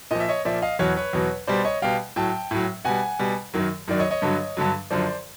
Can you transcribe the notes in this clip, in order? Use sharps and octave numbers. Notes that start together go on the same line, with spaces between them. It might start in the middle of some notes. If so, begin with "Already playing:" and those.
A#2 F3 D#5
E5
C#5 D#5
A#2 F3 D5 E5
D#5 F5
E2 B2 F#3 B4 C#5
B4 C#5
E2 B2 F#3
B2 G3 C5 D5
C#5 D#5
B2 G3 F5 G5
A2 F#3 G5 A5
A2 F#3
B2 G3 F#5 G#5
B2 G3
F#2 D#3 F#3
F#2 D#3 F#3 D5
C#5 D#5
C#5 D#5
G2 D3 F#3
G2 D3 F#3
F#2 D3 F3 C5 D5